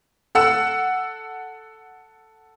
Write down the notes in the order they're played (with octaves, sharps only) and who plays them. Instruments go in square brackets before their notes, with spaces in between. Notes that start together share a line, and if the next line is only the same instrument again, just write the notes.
[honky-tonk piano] A4 F#5 E6